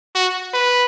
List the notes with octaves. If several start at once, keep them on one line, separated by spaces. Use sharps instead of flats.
F#4
B4